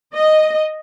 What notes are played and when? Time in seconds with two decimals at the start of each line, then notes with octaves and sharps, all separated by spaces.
0.14 D#5